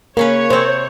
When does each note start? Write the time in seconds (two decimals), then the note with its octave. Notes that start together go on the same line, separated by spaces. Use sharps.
0.17 C#3 A#3 C#4 B4 C#5
0.50 C3 C4 C5